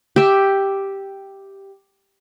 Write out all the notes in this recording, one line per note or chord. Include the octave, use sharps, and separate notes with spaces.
G4 E5